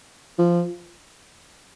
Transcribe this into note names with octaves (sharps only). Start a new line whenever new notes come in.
F3